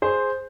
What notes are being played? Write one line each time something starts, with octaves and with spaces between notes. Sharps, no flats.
G#4 C5